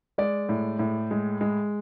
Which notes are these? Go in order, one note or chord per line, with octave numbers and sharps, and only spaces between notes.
G#3 D5
A2
A2
G#3
G#3